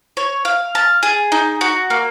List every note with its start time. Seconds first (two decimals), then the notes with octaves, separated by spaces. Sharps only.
0.17 C#5
0.45 F5
0.75 A5
1.03 G#4
1.32 D#4
1.61 F#4
1.90 A#3